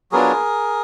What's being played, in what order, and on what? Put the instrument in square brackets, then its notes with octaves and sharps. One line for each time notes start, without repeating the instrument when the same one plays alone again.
[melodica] F#3 B3 D4 F4 G#4 A#4